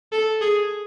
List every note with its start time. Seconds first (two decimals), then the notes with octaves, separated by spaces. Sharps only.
0.12 A4
0.41 G#4